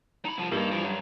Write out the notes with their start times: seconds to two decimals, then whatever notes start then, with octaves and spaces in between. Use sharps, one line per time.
0.25 D#4 B5
0.38 C2 F3
0.52 G2 A#3 D#4
0.71 E3 F3
0.83 F#2